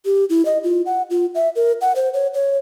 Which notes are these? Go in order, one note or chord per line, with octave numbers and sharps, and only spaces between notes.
G4
E4
D#5
F4
F#5
F4
E5
A#4
F#5
C5
C#5
C#5